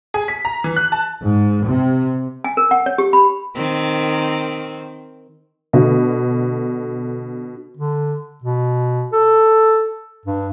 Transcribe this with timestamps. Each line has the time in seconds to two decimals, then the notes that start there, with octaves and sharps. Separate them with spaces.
0.14 G#4
0.28 B6
0.45 A#5
0.64 E3
0.76 F#6
0.92 A5
1.25 G#2
1.68 C3
2.44 G#5
2.57 A#4
2.71 F#5
2.86 C#5
2.98 G4
3.13 B5
3.56 D#3 C4
5.73 B2 D3 A3
7.77 D3
8.43 B2
9.13 A4
10.25 G2